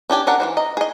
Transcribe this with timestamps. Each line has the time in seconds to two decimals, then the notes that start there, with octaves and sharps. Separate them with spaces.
0.10 C#4 D4 G4 G#5
0.27 C#4 D4 A#4 F#5
0.40 E3 G#3 C5
0.57 D#5 A#5
0.77 G#4 D#5